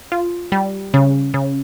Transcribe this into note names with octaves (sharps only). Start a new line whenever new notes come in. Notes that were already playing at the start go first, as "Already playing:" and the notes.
F4
G3
C#3
C#3